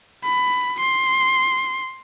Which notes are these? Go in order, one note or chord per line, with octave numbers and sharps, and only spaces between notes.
B5
C6